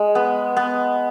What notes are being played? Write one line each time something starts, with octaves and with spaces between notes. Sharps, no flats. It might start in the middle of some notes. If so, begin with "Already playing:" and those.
Already playing: G#3
B3
B3